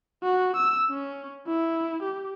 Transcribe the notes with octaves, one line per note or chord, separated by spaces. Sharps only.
F#4
E6
C#4
E4
G4